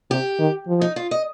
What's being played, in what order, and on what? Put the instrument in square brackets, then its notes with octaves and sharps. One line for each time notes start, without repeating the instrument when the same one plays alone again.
[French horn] C3 [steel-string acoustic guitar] G4
[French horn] D#3
F3
[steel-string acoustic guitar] D#4
F4
D#5